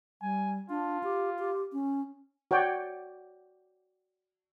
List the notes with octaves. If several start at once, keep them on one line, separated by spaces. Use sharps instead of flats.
G3 G#5
D4 F4
G4
G4
C#4
F#4 C#5 D5 G5